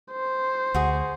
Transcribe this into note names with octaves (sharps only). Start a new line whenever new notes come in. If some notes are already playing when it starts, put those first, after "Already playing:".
C5
D2 F#4 G#4